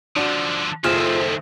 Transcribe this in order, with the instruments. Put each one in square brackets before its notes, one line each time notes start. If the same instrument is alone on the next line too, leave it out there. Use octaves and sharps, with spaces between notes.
[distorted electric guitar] D3 F3 [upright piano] D4 F#4
[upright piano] F#1 G#4 F6 [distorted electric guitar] D#3 E5 [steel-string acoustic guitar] F4 [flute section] A4 C5